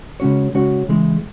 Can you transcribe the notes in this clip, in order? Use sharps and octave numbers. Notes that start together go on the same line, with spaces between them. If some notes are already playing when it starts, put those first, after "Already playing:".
C#3 G#3 C#4 F#4 C#5
C#3 G#3 C#4 F#4 C#5
C#3 E3 G#3